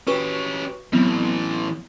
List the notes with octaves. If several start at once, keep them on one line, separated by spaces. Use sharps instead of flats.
C#4 F#4 G4 B4 C#6
A2 E3 F#3 B3 C4